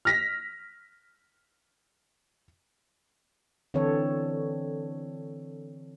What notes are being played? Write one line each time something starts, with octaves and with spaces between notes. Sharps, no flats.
F6 A#6 B6
D3 E3 C4 A4 C#5